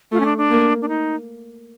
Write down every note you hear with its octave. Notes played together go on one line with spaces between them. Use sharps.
A3 F4
C#4
D4
D4
A#3
D4
D#4